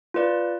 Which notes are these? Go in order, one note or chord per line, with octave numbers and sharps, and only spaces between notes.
F4 B4 D5